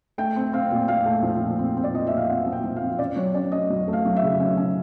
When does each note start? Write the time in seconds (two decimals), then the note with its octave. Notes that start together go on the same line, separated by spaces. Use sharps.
0.18 A3 G5
0.36 C4
0.53 C4 F5
0.71 A#2
0.88 A#2 F5
1.06 A3
1.23 F3
1.42 A#2
1.59 C4
1.77 C4
1.84 D5
1.94 F3 D#5
2.07 A#2 E5
2.17 F5
2.29 C4 F#5
2.46 F3
2.52 G5
2.64 F3
2.76 F5
2.82 C4
2.99 C#4 D5
3.16 F#3 C#5
3.34 C#4 D5
3.52 C#4 D#5
3.70 F#3
3.88 A3
3.93 F5
4.05 F#3
4.16 E5
4.22 C#3
4.40 C#4
4.57 C#4